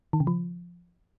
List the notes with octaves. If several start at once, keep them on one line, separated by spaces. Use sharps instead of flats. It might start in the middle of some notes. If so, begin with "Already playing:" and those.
D#3
C#3
F3